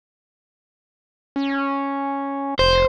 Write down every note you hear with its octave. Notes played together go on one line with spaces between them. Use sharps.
C#4
F1 C5